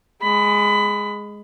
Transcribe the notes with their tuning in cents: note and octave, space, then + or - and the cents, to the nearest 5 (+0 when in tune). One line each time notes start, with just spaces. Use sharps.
G#3 +0 B5 +20